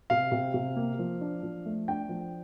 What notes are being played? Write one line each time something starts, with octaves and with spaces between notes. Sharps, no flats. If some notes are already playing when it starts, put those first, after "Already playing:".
C3 F5
C3
C3
A#3
F3
D4
F3
A3
D4 G5
F3